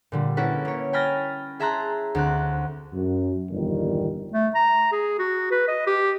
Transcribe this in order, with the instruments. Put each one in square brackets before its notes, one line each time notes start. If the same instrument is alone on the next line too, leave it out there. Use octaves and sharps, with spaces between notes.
[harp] A#2 D3 G3
A#3 C#4 E4 F#4 A4 B4
A#3 C#5
G5 G#5 B5 F6 A6 A#6
G#4 E5 A5 A#5 C6 F#6
D2 C4 F#6
[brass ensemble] F#2
G1 E2 A#2 D#3 G3
[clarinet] A3
A#5
G#4
F#4
B4
D#5
G4